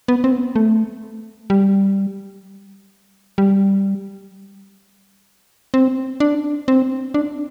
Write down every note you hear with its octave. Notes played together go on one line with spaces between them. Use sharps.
B3
C4
B3
A3
G3
G3
C4
D4
C4
D4